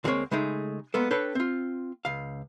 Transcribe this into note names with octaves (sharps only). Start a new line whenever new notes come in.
D2 F3 G#3 A#3 C4 C#5
C#3 G#3 A3 D#4 G#4
G#3 A#3 B3 A4
D4 A4 B4 C#5 G5
C4 F4
C#2 F5